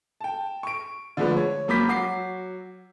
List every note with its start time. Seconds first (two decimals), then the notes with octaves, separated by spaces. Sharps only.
0.21 G5 A5
0.63 C#6 D7
1.17 D3 F3 G#3 A3 B4 D5
1.37 C#5
1.68 F#2 A#3 B5 D6 G6 B6
1.88 F#3 F#4 D6 C7